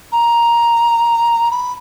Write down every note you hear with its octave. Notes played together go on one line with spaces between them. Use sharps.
A#5
B5